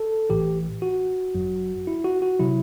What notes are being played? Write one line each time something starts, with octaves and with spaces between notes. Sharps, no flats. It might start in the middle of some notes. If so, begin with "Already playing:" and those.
Already playing: A4
A1 A2 E3 G4
F#4
G1 F#2 F#3
E4
F#4
F#4
C3 F#3 E4